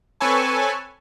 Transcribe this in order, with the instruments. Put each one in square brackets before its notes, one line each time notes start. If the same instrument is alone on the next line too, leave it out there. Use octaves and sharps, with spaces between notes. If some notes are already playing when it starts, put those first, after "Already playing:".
[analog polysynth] C4 A4 B4 C#5 G#5 A5